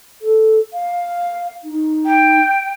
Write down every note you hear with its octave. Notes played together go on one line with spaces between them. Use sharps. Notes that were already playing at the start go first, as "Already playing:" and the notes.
A4
F5
D#4
G5